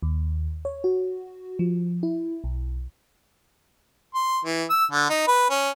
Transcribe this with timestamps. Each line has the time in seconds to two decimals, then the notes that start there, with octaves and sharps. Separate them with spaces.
0.03 D#2
0.65 C#5
0.84 F#4
1.59 F3
2.03 E4
2.44 B1
4.15 C6
4.45 E3
4.70 E6
4.92 D3
5.10 D#4
5.28 B4
5.50 C#4